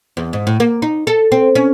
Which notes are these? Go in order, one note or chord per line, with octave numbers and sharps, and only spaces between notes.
E2
G#2
A2
A#3
D#4
A4
C4
C#4